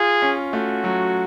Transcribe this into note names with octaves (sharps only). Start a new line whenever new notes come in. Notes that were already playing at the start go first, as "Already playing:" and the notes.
Already playing: F4 G#4
C#4
A3 F#4
F#3